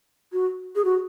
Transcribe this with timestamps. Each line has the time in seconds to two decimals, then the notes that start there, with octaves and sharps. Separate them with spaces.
0.33 F#4
0.76 G#4
0.85 F#4